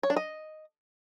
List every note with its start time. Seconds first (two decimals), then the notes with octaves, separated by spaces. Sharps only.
0.03 C#5
0.10 D4
0.16 D#5